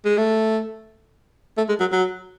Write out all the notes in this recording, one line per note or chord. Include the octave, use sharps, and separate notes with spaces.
G#3
A3
A3
G#3
F#3
F#3